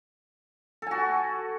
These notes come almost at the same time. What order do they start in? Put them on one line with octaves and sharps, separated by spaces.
A4 G#5 F#4